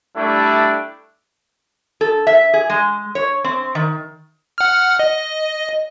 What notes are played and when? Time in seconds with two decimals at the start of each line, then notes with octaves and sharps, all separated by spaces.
0.17 G3 A3 D4 E4 A4
2.01 A4
2.27 E5
2.53 G#4
2.70 G#3
3.15 C#5
3.44 C4
3.75 D#3
4.58 F#5 F6
4.99 D#5